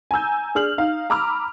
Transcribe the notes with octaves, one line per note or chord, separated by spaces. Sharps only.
G#5 A#5 E6 G6
D4 G#4 F6 F#7
D#4 F5
A#5 B5 D6 E6 F6